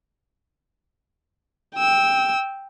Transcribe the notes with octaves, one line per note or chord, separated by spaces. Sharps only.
G5 E6